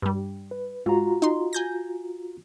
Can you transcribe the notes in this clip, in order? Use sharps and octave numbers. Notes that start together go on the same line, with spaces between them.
G2 G3
B4
G#2 F4 F#4 A#5
D#4 C6
G#5 G6 A#6